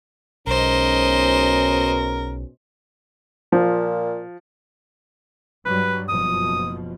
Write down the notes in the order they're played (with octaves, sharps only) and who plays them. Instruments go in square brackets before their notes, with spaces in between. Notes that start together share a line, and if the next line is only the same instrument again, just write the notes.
[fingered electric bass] B1 [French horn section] G#2 B2 C#4 [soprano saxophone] A#4 [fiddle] C5 D#5
[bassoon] A#2 [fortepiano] F3
[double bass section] G2 F#3 G3 [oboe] B4
[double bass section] F#1 B2 F3 [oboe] D#6